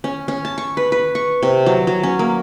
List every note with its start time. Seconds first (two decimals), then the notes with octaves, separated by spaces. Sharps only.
0.04 C#4
0.28 C#4
0.45 A5
0.58 C#6
0.77 B4
0.92 B4
1.15 C#6
1.43 C3
1.66 F#3
1.87 F#3
2.03 C#4
2.19 A#3